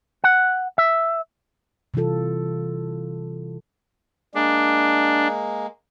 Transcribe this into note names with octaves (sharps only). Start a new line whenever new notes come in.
F#5
E5
C3 E3 G3 F4 A4
G#3 A#3 D4